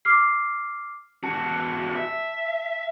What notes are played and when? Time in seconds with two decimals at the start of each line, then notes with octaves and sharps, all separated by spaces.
0.05 D6 F6 C7
1.24 E2 F#4 A5
1.95 E5